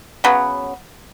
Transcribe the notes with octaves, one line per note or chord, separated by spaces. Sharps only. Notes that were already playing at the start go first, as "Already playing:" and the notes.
C#3 F#3 B3